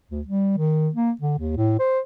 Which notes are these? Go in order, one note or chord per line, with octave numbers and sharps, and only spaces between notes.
D2
G3
D#3
A#3
D3
D#2
A2
C5